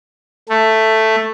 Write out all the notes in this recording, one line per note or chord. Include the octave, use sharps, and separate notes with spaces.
A3